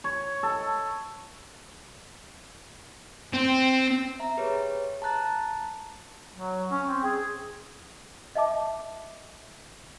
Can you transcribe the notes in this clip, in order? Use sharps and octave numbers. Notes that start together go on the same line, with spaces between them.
C#5
A4
C4
E5 A#5
G4 G#4 B4 C#5
A5 A#5 F#6 A6
F#3
C#4
C4
G#4
D#5 E5 A5 D6